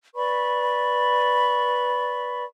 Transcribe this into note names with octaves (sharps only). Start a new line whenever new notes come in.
B4 D5 B5 C#6